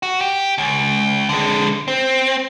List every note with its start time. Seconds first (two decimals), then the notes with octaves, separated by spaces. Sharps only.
0.03 F#4
0.21 G4
0.58 C#2
1.29 D3 G#3
1.88 C4